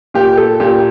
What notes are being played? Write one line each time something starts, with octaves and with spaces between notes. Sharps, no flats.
A#2 G4
A4
A#2 G4